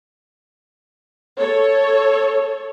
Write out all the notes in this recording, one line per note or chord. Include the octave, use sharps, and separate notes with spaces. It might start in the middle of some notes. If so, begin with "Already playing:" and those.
A4 C#5